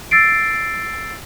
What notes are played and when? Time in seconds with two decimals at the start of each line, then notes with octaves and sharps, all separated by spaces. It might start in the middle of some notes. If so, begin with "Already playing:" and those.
0.11 E6 A6 C7 D7